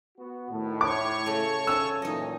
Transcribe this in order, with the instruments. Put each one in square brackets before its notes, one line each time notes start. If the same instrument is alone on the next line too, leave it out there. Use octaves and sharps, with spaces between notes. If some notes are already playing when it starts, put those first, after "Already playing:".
[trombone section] B3 F#4
[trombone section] A2 [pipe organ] D#3
[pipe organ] C#5 C#6 [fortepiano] D6
[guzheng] C#3 A3
[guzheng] C#4 A4 [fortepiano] E6
[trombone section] A#2 E3 F#3 [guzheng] D#4 D#5